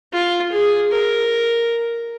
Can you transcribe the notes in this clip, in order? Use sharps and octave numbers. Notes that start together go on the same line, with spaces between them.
F4
G#4
A#4